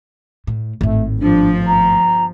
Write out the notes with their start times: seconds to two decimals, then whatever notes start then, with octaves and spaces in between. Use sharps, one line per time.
0.47 A2
0.81 G#1 A2 A3
1.20 G1 F3 D4
1.67 A#5